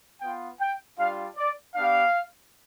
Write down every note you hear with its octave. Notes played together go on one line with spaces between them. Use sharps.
B3 F4 G5
G5
G3 D4 F4 F5
D5
B3 D4 G4 F5